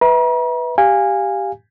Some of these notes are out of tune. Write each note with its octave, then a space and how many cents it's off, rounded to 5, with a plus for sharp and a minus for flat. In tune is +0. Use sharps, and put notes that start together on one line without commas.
B4 +0 E5 -25 A#5 +45
G4 +0 F5 +0 G#5 -20